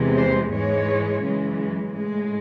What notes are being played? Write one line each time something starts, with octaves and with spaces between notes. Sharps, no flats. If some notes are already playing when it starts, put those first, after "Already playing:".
Already playing: E2 C3 E3 G#3
C5
G#2 E3 G#3 C#5
F#2 C#3 E3 G#3
A2 G#3